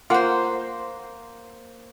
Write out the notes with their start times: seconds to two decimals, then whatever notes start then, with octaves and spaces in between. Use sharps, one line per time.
0.10 A#3 F4 C5 F#5